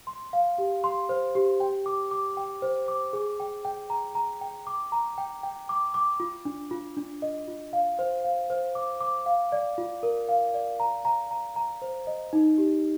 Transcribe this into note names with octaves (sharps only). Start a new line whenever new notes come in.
C6
F5
G4
C6
C5
G4
G5
D6
D6
G5
C5
D6
G#4
G5
G5
A#5
A#5
G5
D6
A#5
G5
G5
D6
D6
F4
D4
F4
D4
D#5
F4
F5
C5
F5
C5
D6
D6
F5
D5
F4
A#4
F5
D5
A#5
A#5
A#5
A#5
C5
D#5
D#4
G4